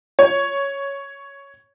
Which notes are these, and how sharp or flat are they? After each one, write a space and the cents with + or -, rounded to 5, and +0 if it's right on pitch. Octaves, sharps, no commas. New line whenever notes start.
C#5 +5